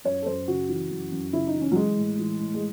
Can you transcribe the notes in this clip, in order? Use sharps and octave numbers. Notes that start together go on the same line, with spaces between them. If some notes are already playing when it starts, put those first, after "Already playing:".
F#2 C#5
A4
F#2 C5
C#3 F#4
E3
F#2
F#2
C#3 E4
D#4
E3
C#4
F#3
E3 G#3
A2
E3
A2
G#3